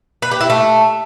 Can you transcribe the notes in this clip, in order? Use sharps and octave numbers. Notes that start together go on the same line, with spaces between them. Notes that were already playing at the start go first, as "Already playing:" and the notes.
B4
G4
E4
A3